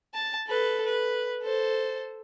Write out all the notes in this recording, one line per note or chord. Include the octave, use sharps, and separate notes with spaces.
A5
A4 B4
B4
A4 C5